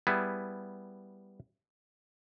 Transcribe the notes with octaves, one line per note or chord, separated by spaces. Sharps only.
G3 B3 E4 G#4